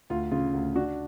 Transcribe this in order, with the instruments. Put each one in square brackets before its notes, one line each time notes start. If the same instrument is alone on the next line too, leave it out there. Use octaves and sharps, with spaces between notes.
[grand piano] D2 F4
C#3 F4
D2
D4 F#4